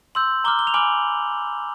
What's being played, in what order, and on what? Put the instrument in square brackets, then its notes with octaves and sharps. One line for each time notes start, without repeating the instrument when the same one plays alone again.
[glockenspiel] C6 E6 G6 F#7
A#5 D6 F6 G7
G7
F7
G#5 B5 D6 F6 F#7